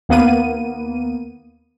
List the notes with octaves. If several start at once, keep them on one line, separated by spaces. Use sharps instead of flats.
D#2 A#3 B3 D#7